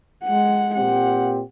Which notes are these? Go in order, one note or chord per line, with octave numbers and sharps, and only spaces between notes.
G#3 F#5
A#2 C4 G4 F#5